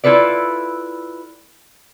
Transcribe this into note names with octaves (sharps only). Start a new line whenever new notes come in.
E4 F4 A4 B4 D5